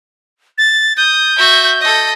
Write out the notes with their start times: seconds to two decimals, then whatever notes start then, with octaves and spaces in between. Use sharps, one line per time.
0.58 A6
0.97 D#6 G6
1.38 F#4 E5
1.80 A4 D#5